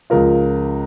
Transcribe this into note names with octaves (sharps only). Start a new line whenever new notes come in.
C#2 C#3 F3 F4 A#4